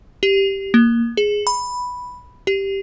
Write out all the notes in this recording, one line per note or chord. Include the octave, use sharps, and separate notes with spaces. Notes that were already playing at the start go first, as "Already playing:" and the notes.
G4
A#3
G#4
B5
G4